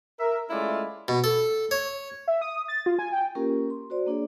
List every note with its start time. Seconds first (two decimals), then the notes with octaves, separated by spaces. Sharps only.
0.20 A#4 E5
0.50 G#3 A3 C#4 E4 F4 D5
1.08 B2
1.24 A4
1.71 C#5
2.28 E5
2.41 D#6
2.68 A6
2.86 F4
2.99 G#5
3.12 G5
3.35 A#3 C#4 F4 G4 A#4
3.70 C6
3.90 F#4 C5 D5
4.07 A#3 D4 G#4 C#5 D5